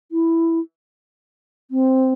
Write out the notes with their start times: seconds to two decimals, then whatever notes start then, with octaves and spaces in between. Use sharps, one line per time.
0.12 E4
1.71 C4